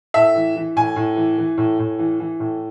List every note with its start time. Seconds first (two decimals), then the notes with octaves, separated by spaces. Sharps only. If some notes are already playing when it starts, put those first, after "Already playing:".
0.14 A2 E5
0.35 E3
0.56 E3
0.76 A2 G#5
0.96 A2
1.17 E3
1.38 E3
1.58 A2
1.79 A2
1.99 E3
2.20 E3
2.40 A2